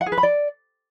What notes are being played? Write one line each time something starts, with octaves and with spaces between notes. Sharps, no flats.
F#5
G#4
B4
B5
D5